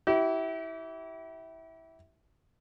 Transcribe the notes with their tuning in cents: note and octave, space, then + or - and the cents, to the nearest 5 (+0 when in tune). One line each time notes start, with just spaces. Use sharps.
E4 -15 G4 -35